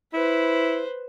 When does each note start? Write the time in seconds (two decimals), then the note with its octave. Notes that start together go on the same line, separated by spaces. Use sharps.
0.13 E4 B4 C5